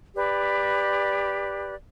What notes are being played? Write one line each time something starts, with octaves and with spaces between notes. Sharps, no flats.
G4 B4 D5